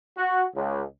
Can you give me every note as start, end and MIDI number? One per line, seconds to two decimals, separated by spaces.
0.17 0.43 66
0.55 0.82 37